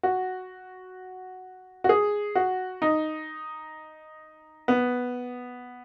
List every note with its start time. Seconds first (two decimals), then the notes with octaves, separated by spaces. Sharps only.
0.03 F#4
1.84 F#4
1.89 G#4
2.35 F#4
2.82 D#4
4.68 B3